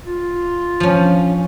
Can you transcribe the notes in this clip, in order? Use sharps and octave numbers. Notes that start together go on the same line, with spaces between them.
F4
F3 C#4